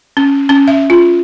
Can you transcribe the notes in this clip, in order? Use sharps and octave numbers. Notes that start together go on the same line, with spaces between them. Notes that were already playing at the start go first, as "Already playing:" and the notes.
C#4
C#4
E5
F4